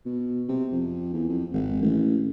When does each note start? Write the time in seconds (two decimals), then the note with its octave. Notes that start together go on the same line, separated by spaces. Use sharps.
0.06 B2
0.48 C3
0.72 F2
1.14 E2
1.29 F2
1.53 G#1
1.83 A1